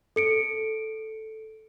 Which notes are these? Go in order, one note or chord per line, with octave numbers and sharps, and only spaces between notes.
A4 C#7 D7